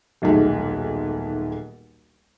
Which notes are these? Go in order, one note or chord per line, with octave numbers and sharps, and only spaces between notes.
D#1 B1 G#2 A3 G#4